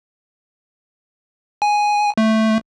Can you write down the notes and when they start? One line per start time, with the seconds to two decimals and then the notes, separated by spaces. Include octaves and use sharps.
1.62 G#5
2.18 A3